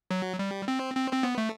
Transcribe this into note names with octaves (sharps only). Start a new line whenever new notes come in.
F#3
G3
C4
C4
C4
B3
A3